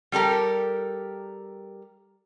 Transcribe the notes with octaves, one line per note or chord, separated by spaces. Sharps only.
G3 G4 A4 A#4